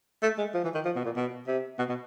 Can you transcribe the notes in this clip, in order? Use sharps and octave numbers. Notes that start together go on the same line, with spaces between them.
A3
G#3
F3
E3
D#3
F3
B2
A#2
B2
C3
B2
B2